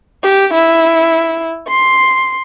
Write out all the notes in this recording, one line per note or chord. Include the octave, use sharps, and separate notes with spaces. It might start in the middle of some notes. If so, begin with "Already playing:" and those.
G4
E4
C6